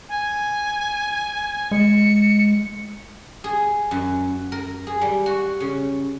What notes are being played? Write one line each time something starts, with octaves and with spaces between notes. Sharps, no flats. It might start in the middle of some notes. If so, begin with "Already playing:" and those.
G#5
G#3 C#7
G#4
F#2
A#4
G#4
G3
F#4
C#3